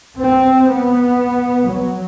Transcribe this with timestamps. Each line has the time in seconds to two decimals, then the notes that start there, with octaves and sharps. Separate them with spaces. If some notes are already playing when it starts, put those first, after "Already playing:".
0.19 C4
0.68 B3
1.66 F#3